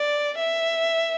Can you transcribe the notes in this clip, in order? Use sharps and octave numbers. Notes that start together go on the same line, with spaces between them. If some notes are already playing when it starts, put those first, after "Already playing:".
Already playing: D5
E5